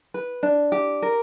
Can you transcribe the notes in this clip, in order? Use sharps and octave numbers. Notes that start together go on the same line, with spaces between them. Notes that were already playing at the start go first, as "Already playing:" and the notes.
B4
D4
G4
A#4